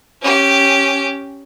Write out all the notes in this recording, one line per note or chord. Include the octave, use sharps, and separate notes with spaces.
C#4 G4